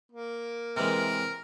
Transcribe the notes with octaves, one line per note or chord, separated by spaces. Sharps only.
A#3
C3 E3 G#3 A#4